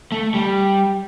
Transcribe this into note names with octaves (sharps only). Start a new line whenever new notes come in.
A3
G3